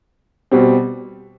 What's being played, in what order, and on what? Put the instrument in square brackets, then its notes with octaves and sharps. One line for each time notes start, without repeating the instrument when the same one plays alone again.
[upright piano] B2 G3 C4